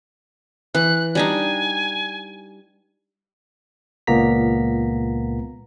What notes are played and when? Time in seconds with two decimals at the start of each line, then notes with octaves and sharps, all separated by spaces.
0.75 E3 F#6
1.15 G3 D4 D#4 G#5
4.07 C#2 A#2 A#3 B3 A#5 B6